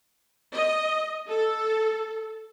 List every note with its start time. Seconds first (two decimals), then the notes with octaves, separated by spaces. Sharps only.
0.54 D#5
1.27 A4